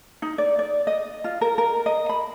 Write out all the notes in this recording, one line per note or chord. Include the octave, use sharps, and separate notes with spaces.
D#4
D5
D5
D#5
F4
A#4
A#4
D#5
B5